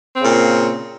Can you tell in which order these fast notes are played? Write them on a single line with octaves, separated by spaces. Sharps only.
C4 C#3 A#2